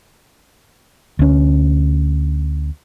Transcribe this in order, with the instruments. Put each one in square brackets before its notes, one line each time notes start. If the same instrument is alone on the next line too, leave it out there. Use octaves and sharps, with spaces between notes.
[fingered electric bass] D2 C#4